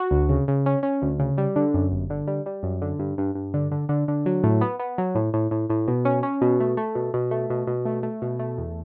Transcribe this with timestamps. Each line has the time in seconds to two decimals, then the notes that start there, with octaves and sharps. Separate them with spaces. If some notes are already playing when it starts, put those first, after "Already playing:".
Already playing: F#4
0.11 D2
0.29 C#3
0.48 C#3
0.66 C#4
0.83 C#4
1.02 D2
1.19 C#3
1.38 G3
1.56 D3
1.74 F#2
1.92 G1
2.10 D3
2.27 G3
2.46 G3
2.63 F#2
2.82 D3
2.99 G2
3.18 G2
3.35 G2
3.54 D3
3.71 D3
3.89 D3
4.08 D3
4.26 F#3
4.43 A2
4.61 B3
4.80 B3
4.98 F#3
5.15 A2
5.34 A2
5.51 A2
5.70 A2
5.88 B2
6.05 C#4
6.23 C#4
6.41 B2
6.60 A3
6.77 A3
6.95 B2
7.14 B2
7.31 A3
7.50 B2
7.67 B2
7.85 A3
8.03 A3
8.22 B2
8.39 A3
8.58 E2